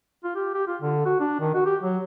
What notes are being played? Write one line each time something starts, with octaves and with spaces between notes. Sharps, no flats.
F4
G4
G4
F4
D3
F#4
D4
D#3
F#4
G4
F#3